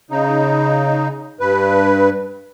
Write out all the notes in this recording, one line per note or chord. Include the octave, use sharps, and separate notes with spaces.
C#3 D#4
G2 B4